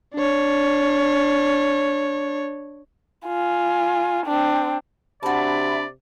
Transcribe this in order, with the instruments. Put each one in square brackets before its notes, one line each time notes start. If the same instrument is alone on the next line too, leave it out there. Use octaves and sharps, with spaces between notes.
[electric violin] D4 C#5
[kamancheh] F4 G#5
C4 D4
[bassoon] C3 [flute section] D4 E5 B5 [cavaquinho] F#4 A5 [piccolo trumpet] D5